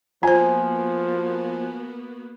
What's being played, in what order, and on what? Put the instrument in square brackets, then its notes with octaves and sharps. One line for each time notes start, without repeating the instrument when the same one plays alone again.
[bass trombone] F3 [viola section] A#3 B3 F#4 [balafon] F4 C5 [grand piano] G#5